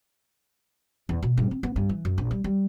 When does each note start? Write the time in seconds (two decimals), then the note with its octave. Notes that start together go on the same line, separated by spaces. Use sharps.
1.09 E2
1.23 B2
1.37 G2
1.51 C4
1.63 B3
1.76 G2
1.89 E3
2.05 F#2
2.18 A#1
2.31 G3
2.44 G3